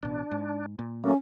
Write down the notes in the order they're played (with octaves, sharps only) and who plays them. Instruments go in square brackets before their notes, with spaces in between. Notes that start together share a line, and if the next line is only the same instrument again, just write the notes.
[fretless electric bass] A1 B2 [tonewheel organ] D4
[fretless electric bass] G#2
A#2
[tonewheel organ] F#3 A3 A#3 [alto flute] C#4